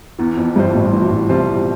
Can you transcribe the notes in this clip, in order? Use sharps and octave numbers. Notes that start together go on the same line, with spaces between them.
E2 E3
F2
G1 G2 G3 C4 F4 C5
A1 A2
A2 E3
B2
A1 A2
C2 C3 G3 C4 F4 C5